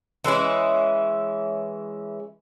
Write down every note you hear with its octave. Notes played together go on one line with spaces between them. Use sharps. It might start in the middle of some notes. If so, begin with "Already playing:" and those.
E3 G#3 C#4 E4